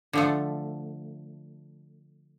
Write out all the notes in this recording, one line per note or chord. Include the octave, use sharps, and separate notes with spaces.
D3 F3 A3